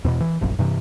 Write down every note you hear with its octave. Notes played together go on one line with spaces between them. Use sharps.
E2 B2
E3
F1 A#1 F#2
G2 C3 E3